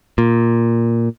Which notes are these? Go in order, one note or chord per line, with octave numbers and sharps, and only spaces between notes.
A#2